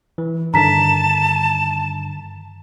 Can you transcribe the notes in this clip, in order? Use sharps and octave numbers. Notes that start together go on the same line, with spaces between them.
E3
G2 D3 D#3 A5 A#5 B6